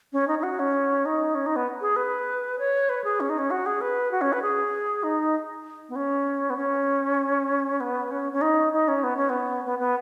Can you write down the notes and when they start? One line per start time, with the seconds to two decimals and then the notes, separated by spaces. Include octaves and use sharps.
0.13 C#4
0.28 D#4
0.39 D#4
0.43 F#4
0.59 C#4
1.05 D#4
1.35 C#4
1.46 D#4
1.56 B3
1.81 G#4
1.96 B4
2.59 C#5
2.89 B4
3.04 G#4
3.20 C#4
3.29 D#4
3.38 C#4
3.51 F#4
3.66 G#4
3.81 B4
4.11 F#4
4.21 C#4
4.33 B4
4.42 G#4
5.03 D#4
5.89 B3
5.96 C#4
6.50 B3
6.57 C#4
7.80 B3
8.11 C#4
8.32 C#4
8.41 D#4
8.73 D#4
8.88 C#4
9.03 B3
9.17 C#4
9.30 B3
9.65 B3
9.79 B3